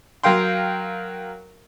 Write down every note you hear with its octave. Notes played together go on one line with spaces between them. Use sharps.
F#3 A#4 F5 G5 C6